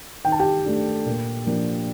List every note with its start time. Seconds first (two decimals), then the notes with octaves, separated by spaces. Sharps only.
0.25 D#3 G5
0.32 A5
0.40 G4 G5
0.65 A3 D4
1.06 A#2
1.46 F3 A#3 D4